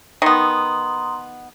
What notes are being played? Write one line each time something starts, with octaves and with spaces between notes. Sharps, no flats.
D#3 B3 A#5 C6 D#6